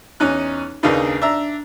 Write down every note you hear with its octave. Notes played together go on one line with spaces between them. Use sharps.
E2 C#4 D#4 F#6
D#2 C#3 A#3 D4 D#4 B4
D4 E5 A#5